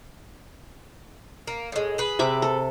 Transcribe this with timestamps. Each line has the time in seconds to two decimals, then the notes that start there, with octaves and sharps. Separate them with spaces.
1.47 A#3
1.72 A2 G#3
1.98 G#4 B4
2.19 C3 E5 D6
2.42 A4